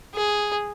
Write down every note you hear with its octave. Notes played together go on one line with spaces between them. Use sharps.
G#4